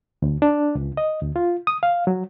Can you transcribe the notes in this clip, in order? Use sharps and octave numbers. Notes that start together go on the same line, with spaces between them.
D2
D4
C#2
D#5
D2
F4
D#6
F5
F#3